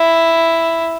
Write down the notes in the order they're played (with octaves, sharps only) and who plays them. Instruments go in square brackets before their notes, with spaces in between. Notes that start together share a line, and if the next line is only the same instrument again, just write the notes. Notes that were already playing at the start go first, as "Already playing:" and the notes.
Already playing: [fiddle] E4